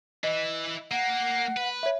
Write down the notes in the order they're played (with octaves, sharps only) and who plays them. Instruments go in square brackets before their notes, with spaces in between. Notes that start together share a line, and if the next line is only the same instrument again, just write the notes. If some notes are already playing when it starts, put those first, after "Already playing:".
[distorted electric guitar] E3 E4 [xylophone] D#5
[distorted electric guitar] A#3 [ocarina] F#5
[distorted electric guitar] B4
[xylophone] C#5 E5